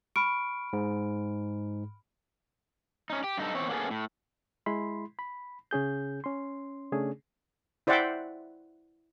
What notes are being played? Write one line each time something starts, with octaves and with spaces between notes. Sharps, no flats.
B5 C#6 F6 D7
G#2
C#4 D#4
G4
G2 D#4 A4
E2 C4 C#5
A#3 B3 C#4 F4 G#4 A4
A2
G#3 E4 B5 C6
B5
C#3 C#4 G#4 G6
C#4 C6
C#3 A3 C#4 D4 G#4
E4 C5 D5 E5 F#5 G5